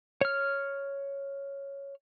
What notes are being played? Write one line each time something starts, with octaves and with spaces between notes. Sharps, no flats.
C#5 F6